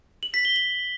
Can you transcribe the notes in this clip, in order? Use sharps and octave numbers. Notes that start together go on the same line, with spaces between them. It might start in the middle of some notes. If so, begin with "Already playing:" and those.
F#7
B6
G7
F#7